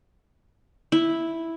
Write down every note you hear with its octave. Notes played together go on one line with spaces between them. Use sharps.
E4